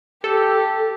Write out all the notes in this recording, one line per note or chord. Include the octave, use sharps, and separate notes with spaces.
G4 A4